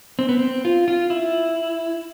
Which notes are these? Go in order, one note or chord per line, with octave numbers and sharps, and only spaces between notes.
C4
B3
C4
F4
F4
E4